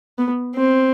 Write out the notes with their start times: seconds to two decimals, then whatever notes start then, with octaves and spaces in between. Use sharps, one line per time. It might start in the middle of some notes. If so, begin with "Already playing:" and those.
0.18 B3
0.55 C4